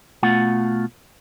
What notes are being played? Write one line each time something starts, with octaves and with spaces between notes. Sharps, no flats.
B2 A3 F4 F#5